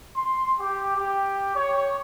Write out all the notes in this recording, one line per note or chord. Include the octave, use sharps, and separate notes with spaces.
C6
G4
G4
C#5